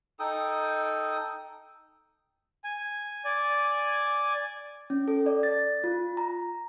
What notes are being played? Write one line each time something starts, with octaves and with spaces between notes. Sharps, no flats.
D#4 A4 G5 D#6
G#5
D5 G#5
C#4
A4
D5
A6
F4
A#5